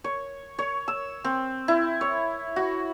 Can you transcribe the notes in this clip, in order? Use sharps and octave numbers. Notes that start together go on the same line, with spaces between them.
C#5
C#5
E6
C4
E4
C#5
F#4